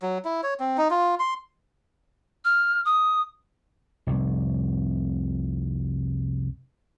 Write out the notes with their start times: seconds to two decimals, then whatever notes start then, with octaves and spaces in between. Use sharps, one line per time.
0.02 F#3
0.25 E4
0.43 C#5
0.60 C4
0.78 D#4
0.90 F4
1.19 C6
2.45 F6
2.85 D#6
4.07 F1 C2